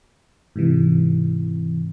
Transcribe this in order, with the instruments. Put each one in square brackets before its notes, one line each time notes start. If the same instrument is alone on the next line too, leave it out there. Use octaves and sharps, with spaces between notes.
[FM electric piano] G#2 C3 E3